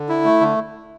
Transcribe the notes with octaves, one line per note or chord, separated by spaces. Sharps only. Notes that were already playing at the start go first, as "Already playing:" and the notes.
Already playing: D3
E4
A3
D3